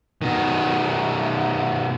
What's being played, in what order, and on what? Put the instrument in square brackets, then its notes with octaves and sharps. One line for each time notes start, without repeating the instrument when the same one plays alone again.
[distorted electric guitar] B2 D#3